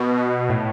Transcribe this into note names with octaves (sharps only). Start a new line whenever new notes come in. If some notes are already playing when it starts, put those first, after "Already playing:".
Already playing: B2
B2
A2